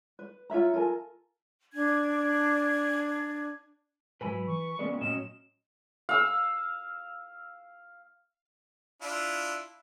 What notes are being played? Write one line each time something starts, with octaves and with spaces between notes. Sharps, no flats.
B4
F4 C#5 E5 A#5
F4 A4 A#4 G#5
D4 G#6
G#2 F#3 B4 G#5 B5
E3 C#6
A#2 C#3 G#3 A#3 B3 D5
A2 F#3 C#4 D#5 E7
F5 E6
D4 E4 F4